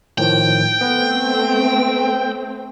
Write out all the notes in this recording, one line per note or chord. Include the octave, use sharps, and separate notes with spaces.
A2 D#3 F3 G5
A3 B3 C4 B4